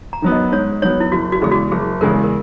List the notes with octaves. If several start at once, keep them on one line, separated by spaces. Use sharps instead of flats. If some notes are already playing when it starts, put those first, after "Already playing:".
A#5
D#3 F#3 B3
D#5
G#2 C#5
D#3 F#3 B3 C#5
E4
F#1 F#4
F#4
E2 C#3 G#3 G#4
F#4
F#1 G#4
E2 C#3 G#3 A#4
A#4